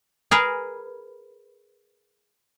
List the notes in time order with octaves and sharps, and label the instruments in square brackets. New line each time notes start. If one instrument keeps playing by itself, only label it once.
[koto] G#4 A#4 B4